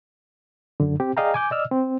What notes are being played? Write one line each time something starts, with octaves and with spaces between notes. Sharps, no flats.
F#2 D3
C4 G4
G#4 D5 D#5 F5 G5 A#5
G#5 D6 G6
D5 D#5 E6 F6
C4